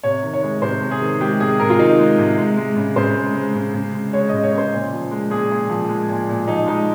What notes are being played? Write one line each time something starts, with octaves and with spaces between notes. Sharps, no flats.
C3 C#5
D#3
C#5
G#3
C3 C5
C3
G#4
D#3
G#3 G4
C3 G#4
C3 A#4
F4
D#3 D#4
G#3
C3
G#3
G#3
C#3
C#3 C5
G#3
G#3
C#3
C#3
G#3
G#3 C#5
D#5
C#3
C#5
C#3 C5
A#2
F3
G#3
A#2 G#4
A#2
F3
G#3
A#2
A#2
F3 D#4
G#3 D#4